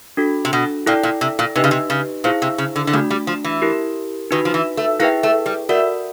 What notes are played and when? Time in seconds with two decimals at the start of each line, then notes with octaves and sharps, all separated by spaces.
0.17 D4 F#4 A4
0.45 C3
0.53 B2
0.86 A#2 E4 A4 D5 G5
1.03 A#2
1.21 C3
1.39 A#2
1.56 C3 D#4 G4 B4 D#5
1.64 C#3
1.71 C3
1.90 C#3
2.24 A#2 E4 G#4 C5 F5
2.42 C3
2.58 C#3
2.76 D3
2.87 D3
2.93 C#3 A3 D4 F#4
3.11 G3
3.27 F3
3.44 E3
3.62 E4 G4 A#4
4.31 D#3 D#4 F#4 B4
4.45 F3
4.54 E3
4.77 A3
5.00 A#3 E4 G#4 B4 E5 G5
5.23 A3
5.46 G3
5.69 A3 F#4 A#4 D5 F#5